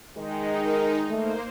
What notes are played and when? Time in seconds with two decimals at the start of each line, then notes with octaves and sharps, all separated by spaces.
0.17 D#3 G#3 D#4
0.66 A#4
1.10 A3 A#3 C5